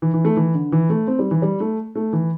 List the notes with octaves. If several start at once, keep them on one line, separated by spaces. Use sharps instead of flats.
E3
E3
A3
E3
D3
E3
A3
C4
G3
E3
G3
A3
A3
E3